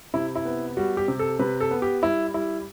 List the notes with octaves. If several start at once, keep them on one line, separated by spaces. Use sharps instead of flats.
C3 E4
E4
B3
G3 F#4
G4
C3
A4
C3 B4
A4
B3
G4
G3 E4
G3 E4